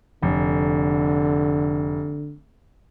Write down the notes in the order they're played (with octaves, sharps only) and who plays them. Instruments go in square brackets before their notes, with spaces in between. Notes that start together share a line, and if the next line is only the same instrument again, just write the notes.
[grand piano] F1 [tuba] D3